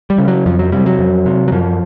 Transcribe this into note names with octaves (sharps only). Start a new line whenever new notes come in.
G3
C#3
F#3
F2 F3
F#3
C3 G3
F#3
F2
C3
F#3
F#2 F3